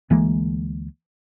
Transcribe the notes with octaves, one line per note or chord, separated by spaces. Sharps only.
D2 E3 G#3 A#3